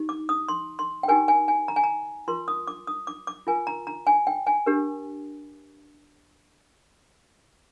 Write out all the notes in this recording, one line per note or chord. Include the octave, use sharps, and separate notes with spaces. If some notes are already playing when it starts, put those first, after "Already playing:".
Already playing: D#4 G4
D6
D#6
C6
C6
G5
D#4 G4 A#4 G#5
G#5
G#5
A#5
G#5
A#5
F4 A#4 C6
D#6
D6
D#6
D6
D6
F4 A#4 G#5
A#5
A#5
G#5
G5
G#5
D4 G4 A#4